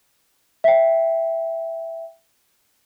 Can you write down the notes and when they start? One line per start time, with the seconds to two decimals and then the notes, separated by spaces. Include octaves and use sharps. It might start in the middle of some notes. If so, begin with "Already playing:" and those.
0.64 E5 G5